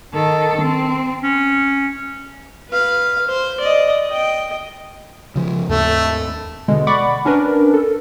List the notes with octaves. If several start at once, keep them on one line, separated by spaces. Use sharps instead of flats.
D#3 A4
C4
C#4
B4 F5
C5
D5 D#5
D#5 G5
C#3 F3
D#2 G#2 A3
B2 D3 G#3
D5 F#5 B5 C#6 D6
C#4 D4 A#4 B4
A4